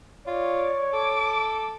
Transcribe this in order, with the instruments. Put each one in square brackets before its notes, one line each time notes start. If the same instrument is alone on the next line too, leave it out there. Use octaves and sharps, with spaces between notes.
[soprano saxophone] F4 [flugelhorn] C#5 [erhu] D5
[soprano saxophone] A4 [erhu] D6